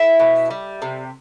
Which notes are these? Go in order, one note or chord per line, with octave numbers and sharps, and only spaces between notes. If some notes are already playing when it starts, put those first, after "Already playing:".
Already playing: E4 E5
B2
G3
C3